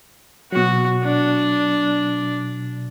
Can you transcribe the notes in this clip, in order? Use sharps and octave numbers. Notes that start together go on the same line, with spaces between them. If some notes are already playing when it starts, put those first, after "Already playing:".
B2 F#3 F#4
D4